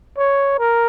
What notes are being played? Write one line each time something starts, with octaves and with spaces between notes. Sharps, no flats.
C#5
A#4